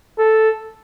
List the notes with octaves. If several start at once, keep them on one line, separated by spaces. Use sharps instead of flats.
A4